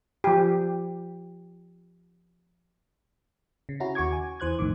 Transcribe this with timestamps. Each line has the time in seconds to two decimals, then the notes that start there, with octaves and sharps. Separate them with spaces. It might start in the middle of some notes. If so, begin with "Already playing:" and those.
0.24 F3 G4
3.69 C#3
3.80 C#4 E4 F#4 A#5
3.95 D#2 F#4 C#6 D6 G#6
4.13 G#5
4.40 E2 E3 C5 F#6 G#6
4.59 B1 F2 A2 D#3 D6